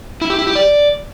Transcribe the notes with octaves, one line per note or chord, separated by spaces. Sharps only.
E4
G4
E4
G4
D5